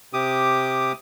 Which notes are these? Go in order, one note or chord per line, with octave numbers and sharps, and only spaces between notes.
C3 G4 D6 D#6